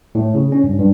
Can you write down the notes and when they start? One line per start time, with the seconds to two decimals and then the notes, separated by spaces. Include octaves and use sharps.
0.15 A2
0.35 C#3
0.52 C#4
0.64 G2
0.80 G2